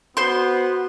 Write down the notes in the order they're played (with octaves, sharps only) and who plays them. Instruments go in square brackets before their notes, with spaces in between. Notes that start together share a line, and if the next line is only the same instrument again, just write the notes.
[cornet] B3 [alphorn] F#4 [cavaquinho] C5 C6